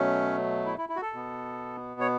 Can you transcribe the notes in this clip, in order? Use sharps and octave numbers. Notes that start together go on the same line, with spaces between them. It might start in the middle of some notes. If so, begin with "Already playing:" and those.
Already playing: B2 F#3 A3 C#4
E4
E4
E4
F#4
A4
B2 B3
C#5